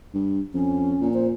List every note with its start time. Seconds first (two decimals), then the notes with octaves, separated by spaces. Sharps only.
0.14 G2
0.54 F2 C#4
1.01 A#2
1.14 C5